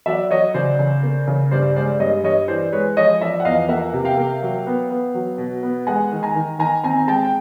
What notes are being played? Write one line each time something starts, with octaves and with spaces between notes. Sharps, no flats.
F#3 D5 E5
F#3 C#5 D#5
C#3 C5 D5
C#3
A#3
C#3
G2 C5 D5
G#3 C5 D5
G2 C#5 D#5
G2 C#5 D#5
E3 C5 D5
G#3 B4 C#5
F3 C#5 D#5
F3 D5 E5
F#5
E2 D#5 F5
A#3 E5 F#5
C3
F5 G5
A#3
F#3
B3
B3
F#3
B2
B3
G#3 F#5 G#5
D#3
G#5 A#5
D#3
D#3 G#5 A#5
C4 G#5 A#5
A#5
G#3 G5 A5
G5